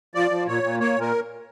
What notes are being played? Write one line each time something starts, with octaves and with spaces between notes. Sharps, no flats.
F3 D5
F3
A#2 C#5
A#2
A#3 C#5
A#2 A#4